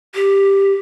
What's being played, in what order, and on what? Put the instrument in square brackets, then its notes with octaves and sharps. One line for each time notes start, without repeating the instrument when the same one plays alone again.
[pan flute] G4